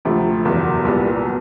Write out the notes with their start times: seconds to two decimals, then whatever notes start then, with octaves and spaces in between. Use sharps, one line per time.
0.05 D2 C3 F3 A3
0.45 F#1 E2 B2 G3
0.85 C2 A#2 G3 B3
1.25 F#3